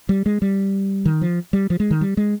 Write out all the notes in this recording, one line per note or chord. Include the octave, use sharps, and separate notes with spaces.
G3
G#3
G3
D#3
F3
G3
F3
G#3
D#3
G3
G#3